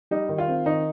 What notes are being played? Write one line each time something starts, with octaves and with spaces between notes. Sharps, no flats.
G3 D#4
D#3
F4
C4
D#3 D#4